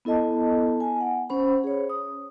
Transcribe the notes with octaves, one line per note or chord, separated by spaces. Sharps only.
B3 E4 A4 D#5 A5
G#5
F#5
C#4 C5 B5
G#4 C#5
D#6